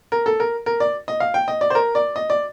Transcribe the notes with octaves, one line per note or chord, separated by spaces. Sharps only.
A#4
A4
A#4
A#4
D5
D#5
F5
G5
D#5
D5
C5
A#4
D5
D#5
D5